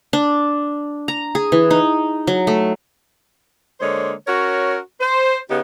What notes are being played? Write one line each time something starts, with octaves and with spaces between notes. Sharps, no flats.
D4
A#5
G#4
E3
D#4
F#3
A3
D3 G#3 A#3 C5 C#5
C#4 F#4 A#4 C#5
C5
C#3 B3 D#4 G4